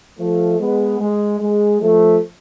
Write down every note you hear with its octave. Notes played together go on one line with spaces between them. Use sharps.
F3 A3
G#3 B3
G#3
G#3
F3 A3